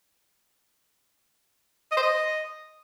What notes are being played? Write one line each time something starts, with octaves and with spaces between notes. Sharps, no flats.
D#5
C5
D#5